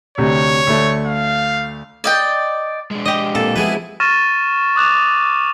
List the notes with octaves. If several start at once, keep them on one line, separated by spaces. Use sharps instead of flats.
D2 C3 C#5
D2 A3
F5
D5 D#5 G5
G#3 D4
G4 D#5
A#2 C4 A4
F3 G#3 B3 E4 G#4 B4
C#6 F6 A6 A#6 D#7 E7
D6 D#6 F#6 E7 F7